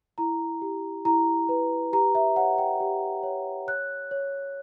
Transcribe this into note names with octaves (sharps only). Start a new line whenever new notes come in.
E4 A#5
G4
E4 A#5
B4
G4 A#5
E5
C#5 F#5
G5
G4
C#5
C#5 F#6
C#5